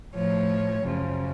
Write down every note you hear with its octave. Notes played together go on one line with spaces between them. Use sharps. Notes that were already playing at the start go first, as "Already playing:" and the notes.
A2 F3 C#5
F#2 C#3 F3